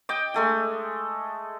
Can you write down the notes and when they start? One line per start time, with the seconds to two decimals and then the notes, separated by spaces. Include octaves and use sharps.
0.09 D#5 G5 D6
0.34 G#3 A3 G#5